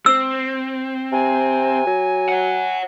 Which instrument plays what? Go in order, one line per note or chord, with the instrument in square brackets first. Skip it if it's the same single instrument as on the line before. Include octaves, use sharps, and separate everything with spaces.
[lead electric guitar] C4 [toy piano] E6
[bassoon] C3 [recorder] G#5
[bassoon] F#3
[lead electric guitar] C#5 F#5